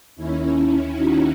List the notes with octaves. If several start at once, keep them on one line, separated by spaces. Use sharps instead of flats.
D#2 D#3 C#4 E4
C#4 E4
D#4 F#4